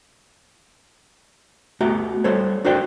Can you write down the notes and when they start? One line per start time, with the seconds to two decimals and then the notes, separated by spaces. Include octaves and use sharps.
1.81 A3 B3 F#4 G4 A#5
2.24 G3 A4 C5 C#5
2.65 D4 F#4 A#4 C5 D5 G5